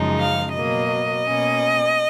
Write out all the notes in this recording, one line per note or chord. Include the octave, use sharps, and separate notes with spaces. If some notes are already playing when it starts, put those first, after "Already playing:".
Already playing: F#2 C#3 F3 G#3 D#4
F5
B2 F#3 A#3 D#5
B2 A#3 C#4